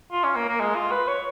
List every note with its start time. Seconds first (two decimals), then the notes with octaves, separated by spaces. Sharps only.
0.12 F4
0.24 C#4
0.35 A#3
0.48 A#3
0.60 G#3
0.75 F4
0.91 B4
1.08 C#5